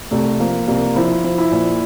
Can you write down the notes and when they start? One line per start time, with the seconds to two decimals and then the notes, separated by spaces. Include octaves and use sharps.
0.11 C2 A3
0.40 F3 A#3
0.67 C2 A#3
0.96 F3 E4
1.24 F3
1.38 E4
1.51 A#2